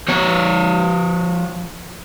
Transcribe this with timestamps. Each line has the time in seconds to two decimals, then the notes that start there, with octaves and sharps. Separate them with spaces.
0.08 F3 C#5